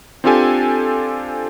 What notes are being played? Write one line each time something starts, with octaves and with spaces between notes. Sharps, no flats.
C4 D4 F4 G4 A4 G#5